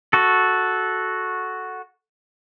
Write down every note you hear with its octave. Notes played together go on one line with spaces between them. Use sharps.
F#4 A4